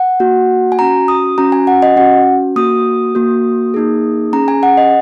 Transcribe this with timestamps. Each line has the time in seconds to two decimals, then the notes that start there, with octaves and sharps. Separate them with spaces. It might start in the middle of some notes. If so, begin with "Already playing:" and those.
Already playing: F#5
0.20 A#3 F#4
0.72 G#5
0.79 C#4 F#4 A#5
1.08 D#6
1.38 C#4 F#4 A#5
1.52 G#5
1.67 F#5
1.82 D#5
1.96 C#4 F#4 F#5
2.56 A#3 F#4 D#6
3.15 A#3 F#4
3.74 A#3 D#4 G#4
4.33 C#4 G#4 A#5
4.48 G#5
4.63 F#5
4.77 D#5